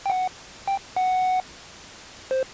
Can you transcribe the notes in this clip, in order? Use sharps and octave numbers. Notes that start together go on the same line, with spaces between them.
G5
F#5
G5
F#5
C5